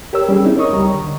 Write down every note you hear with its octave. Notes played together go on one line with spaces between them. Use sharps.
G4 A#4 C#5 E6
G3 C#4 G#4
C4 D#4 E4
A#4 C#5 D#5 C#6 D#6
C#2 G3 A#5
D3